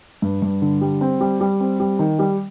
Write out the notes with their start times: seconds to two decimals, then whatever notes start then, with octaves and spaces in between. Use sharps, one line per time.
0.22 G2
0.42 G2
0.62 D3
0.81 G3
1.01 C4
1.20 G3
1.40 G3
1.60 C4
1.80 G3
1.99 D#3
2.19 G3